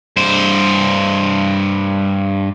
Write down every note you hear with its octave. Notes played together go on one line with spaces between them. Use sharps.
G2 C5